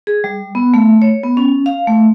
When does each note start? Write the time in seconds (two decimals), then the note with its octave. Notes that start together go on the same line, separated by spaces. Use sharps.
0.07 G#4
0.24 G3
0.55 B3
0.74 A3
1.02 C#5
1.23 B3
1.37 C#4
1.66 F5
1.87 A3